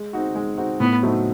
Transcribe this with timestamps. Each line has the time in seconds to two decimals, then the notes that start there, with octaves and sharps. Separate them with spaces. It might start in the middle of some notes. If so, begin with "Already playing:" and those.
Already playing: G#3
0.13 C4 D#4 F#4
0.35 G#3
0.58 C4 D#4 F#4
0.80 A2 B3
1.03 F#3 A3 C4 D#4